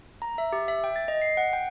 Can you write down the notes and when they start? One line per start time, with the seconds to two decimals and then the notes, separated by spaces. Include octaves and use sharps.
0.22 A#5
0.38 E5
0.53 G4
0.68 E5
0.84 G5
0.96 A6
1.08 D#5
1.22 C7
1.37 F#5
1.53 G5